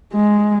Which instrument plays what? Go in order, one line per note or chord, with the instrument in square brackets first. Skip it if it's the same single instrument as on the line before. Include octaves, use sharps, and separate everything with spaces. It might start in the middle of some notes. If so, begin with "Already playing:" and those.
[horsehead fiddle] G#3